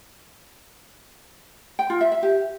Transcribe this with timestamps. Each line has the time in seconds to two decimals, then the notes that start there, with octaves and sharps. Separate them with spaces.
1.79 G5
1.90 F4
2.01 E5
2.12 E5
2.23 G4